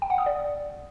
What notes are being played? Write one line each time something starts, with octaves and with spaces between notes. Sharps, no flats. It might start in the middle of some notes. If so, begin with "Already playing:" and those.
G5
F#5
D#6
D5